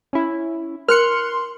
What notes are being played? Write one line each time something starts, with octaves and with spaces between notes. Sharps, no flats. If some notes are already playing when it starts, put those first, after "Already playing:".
C#4 E4
A#4 C6 F6 F#6 C#7